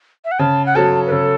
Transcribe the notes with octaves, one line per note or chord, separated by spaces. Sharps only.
E5
F#5
C#3 A5
F#5
F#3 C#4 F#4 A4 A5
B4
C#3 A4